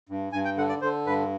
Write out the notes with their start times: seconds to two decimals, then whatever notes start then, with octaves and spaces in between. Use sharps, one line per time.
0.09 G2
0.32 G2 G#5
0.45 G5
0.57 D3 F#5
0.69 D5
0.81 D3 C5
1.06 G2 B4